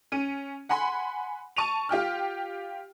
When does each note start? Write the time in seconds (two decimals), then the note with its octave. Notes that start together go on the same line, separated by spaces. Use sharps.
0.12 C#4 D#7
0.69 F#5 G#5 B5 C6
1.57 A5 C#6 D#7 F7
1.89 F4 G4 G5 F6